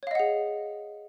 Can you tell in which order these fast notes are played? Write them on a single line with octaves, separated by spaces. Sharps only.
C#5 F5 D#5 F#5 G#4